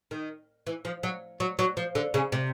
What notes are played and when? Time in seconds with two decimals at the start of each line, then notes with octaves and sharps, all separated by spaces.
0.11 D#3
0.67 E3
0.85 F3
1.03 F#3
1.40 F#3
1.59 F#3
1.77 F3
1.95 D3
2.14 C#3
2.32 C3